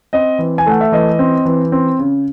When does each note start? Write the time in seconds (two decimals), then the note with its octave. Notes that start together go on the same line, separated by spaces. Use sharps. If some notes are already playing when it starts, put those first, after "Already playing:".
0.13 C4 D#5
0.39 E3
0.58 G#5
0.66 A3 F#5
0.81 E5
0.92 E3 D#5
1.19 C4
1.45 E3
1.72 C4
1.99 C#3